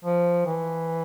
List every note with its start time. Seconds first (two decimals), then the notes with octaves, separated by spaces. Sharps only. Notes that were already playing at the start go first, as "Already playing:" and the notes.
0.05 F3
0.46 E3